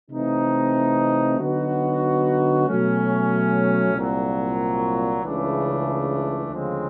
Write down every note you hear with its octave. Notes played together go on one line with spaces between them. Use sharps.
C3 E3 A3 C4 D#4
D3 F#3 B3 D#4 F#4
B2 F#3 A3 C#4
C2 A#2 F#3
C#2 C#3 E3 A3 D4
D2 C#3 F3 G#3 C4